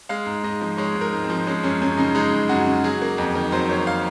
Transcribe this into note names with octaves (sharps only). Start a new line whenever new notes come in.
G#3 F5
G#2
G#2 D#5
F3
G#3 C#5
G#2
A#4
G#2
C4
F3
G#3 C#4
F#2 C#4
F#2 C#4
C#3 D#4
G#3 D#4
F#2
F#2 F#4
C#3
F#3 G#4
A#3
F2
D#3
F#3 C5
A#3 C#5
F5